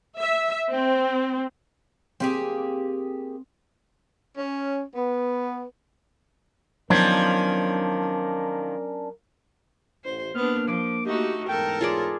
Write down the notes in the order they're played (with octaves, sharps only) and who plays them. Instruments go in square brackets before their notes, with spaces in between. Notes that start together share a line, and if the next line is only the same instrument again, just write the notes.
[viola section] E5
C4
[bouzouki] A#3 G4 G#4 [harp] C4
[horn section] C#4
B3
[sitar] D#3 F3 [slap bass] F#3 B3 [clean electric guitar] C#4 D4 [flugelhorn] A#4
[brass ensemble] A1 [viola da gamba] C5
[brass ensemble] A#3 [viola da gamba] B3 D4 [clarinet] F6
[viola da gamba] F3 [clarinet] D6
[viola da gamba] A3 D#4 F#4 [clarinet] G4
[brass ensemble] E2 G#2 [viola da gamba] A4 A#4 [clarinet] G5
[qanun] F4 G#4 D5 [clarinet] C#5